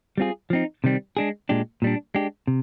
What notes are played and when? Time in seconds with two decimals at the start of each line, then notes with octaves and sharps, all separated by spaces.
0.18 G3 C4 F4 G#4
0.50 F3 C4 D#4
0.84 C3 D#3 G3 C4
1.17 G#3 D4 G#4
1.49 A#2 G#3 D4 G4
1.82 A#2 G3 D4
2.15 G#3 D4 G4
2.47 C3